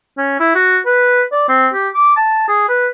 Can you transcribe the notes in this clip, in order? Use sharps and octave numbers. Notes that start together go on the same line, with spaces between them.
C#4
E4
F#4
B4
D5
C4
G4
D6
A5
G#4
B4